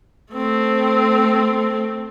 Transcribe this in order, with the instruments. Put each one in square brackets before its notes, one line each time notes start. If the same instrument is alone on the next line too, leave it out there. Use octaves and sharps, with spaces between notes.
[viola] A3 C4